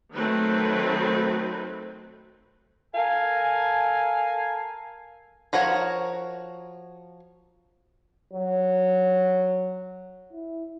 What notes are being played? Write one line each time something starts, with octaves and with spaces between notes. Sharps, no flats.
D#3 F#3 A3 C4 B4
A4 A#4 F5 G#5
F3 F#4 A#4 C#5
F#3
E4